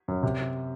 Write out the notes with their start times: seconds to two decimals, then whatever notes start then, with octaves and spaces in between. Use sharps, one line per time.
0.08 F#2
0.23 C3